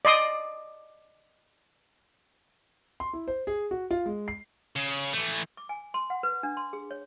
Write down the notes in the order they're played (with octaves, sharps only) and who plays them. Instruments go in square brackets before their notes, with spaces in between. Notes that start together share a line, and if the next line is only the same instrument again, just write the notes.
[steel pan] D5 D#5 C6 D#6
[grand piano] C6
E4
C5
G#4
F#4
F4
G#3
C7
[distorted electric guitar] C#3
E3 A3
[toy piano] D6
G#5
C6
F#5
B4
D4
C6
G#4
C#5